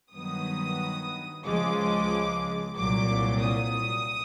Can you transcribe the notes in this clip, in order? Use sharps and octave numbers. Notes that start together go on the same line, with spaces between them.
G2 D#3 F#3 B3 D#6
C#2 C#3 F3 G#3 D6
C2 A#2 F#3 D6
D#6